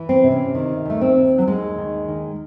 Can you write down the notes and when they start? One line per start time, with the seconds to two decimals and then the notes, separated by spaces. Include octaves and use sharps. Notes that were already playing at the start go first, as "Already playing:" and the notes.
Already playing: E3
0.09 C4
0.24 C3
0.32 C#4
0.55 D#3
0.85 D#2 A3
1.01 C4
1.16 D#3
1.38 F#3
1.47 D#2 G#3
1.78 D#3
2.08 D#3